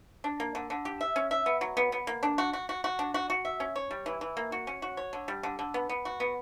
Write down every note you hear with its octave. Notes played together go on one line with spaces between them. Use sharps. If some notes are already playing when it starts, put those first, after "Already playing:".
D4
A#3
D3
D3
G4
E5
C#4
E5
B3
F#3
B3
B3
A#3
D4
F#4
F#4
F#4
F#4
D4
F#4
F#4
E5
C#4
C#5
G3
E3
E3
A#3
F#4
C#4
F#4
C#5
D3
G3
D3
D3
B3
B3
F#4
B3